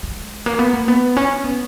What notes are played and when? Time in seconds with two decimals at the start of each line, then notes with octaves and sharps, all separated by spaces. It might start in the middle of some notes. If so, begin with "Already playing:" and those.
0.03 G#3
0.46 A#3
0.59 B3
0.73 A#3
0.88 B3
1.17 C#4
1.44 B3